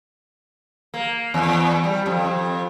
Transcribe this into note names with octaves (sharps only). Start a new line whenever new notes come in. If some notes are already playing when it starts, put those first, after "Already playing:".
A#3
E2
G3
F2
F2